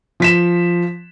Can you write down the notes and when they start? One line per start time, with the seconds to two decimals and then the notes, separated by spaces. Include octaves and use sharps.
0.20 F3 B6 E7